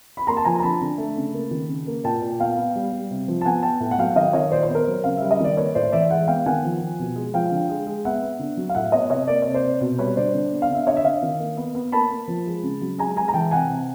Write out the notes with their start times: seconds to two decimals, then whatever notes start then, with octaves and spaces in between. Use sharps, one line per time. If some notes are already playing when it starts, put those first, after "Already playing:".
0.17 B5
0.27 A#3 A#5 C6
0.37 A5
0.45 F3 G#5 A#5
0.59 A#5
0.63 D3 A5 B5
0.81 D3
0.98 A3
1.17 C#3
1.34 A#3
1.51 D#3
1.69 C#3
1.87 A#3
2.04 A#2 G5 A5
2.22 A#2
2.39 B3 F5 G5
2.57 B3
2.76 G3
2.92 G3
3.11 C3
3.28 F3
3.41 A5
3.45 B3 F#5 G#5
3.63 B3 G5 A5
3.80 A2
3.91 F#5
3.98 F#3 F5 G5
4.16 D#3 D#5 F5
4.33 D#3 C#5 D#5
4.51 A#2 C5 D5
4.63 B4 C#5
4.69 B3
4.75 A#4 C5
4.87 F#3
5.04 C#3 F5
5.17 G3 E5
5.31 D#5
5.40 D#3 D5
5.57 A#3 B4 C#5
5.75 A2 C5 D5
5.92 E3 D5 E5
6.10 G#3 E5 F#5
6.27 B3 F5 G5
6.46 D#3 F#5 G#5
6.64 F3
6.81 F3
6.99 B2
7.16 G#3
7.34 F3 F5 G5
7.51 D3
7.69 G#3
7.87 G#3
8.05 B3 E5 F#5
8.22 B3
8.39 D3
8.57 F#3
8.69 F5
8.75 A2 E5 F#5
8.92 B3 C#5 D#5
9.10 C3 C#5 D#5
9.28 A#3 D5
9.42 C3 C#5
9.54 C5 D5
9.63 C3
9.81 B2
9.98 G3 B4 C#5
10.16 D3 C5 D5
10.34 D3
10.52 B3
10.62 F5
10.70 D3 E5
10.87 D3 C#5 D#5
10.97 E5
11.04 D3 D#5 F5
11.22 D#3
11.39 A#3
11.57 B3
11.75 B3
11.92 A#3 A5 B5
12.10 A#3
12.28 F3
12.47 G#3
12.63 C#3
12.81 F#3
12.98 G#3 G#5 A#5
13.16 G#3 G#5 A#5
13.28 A#5
13.34 E3 G5 A5
13.51 C3 F#5 G#5
13.69 C3